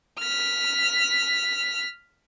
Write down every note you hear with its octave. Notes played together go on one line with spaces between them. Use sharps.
F6 B6